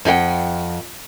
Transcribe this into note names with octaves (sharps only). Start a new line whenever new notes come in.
F2 D#4 E4 F#5 G5